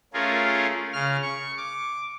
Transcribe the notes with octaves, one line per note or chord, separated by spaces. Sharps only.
A3 C#4 F4 G#4 A#4
C#3 F6
C#6
D6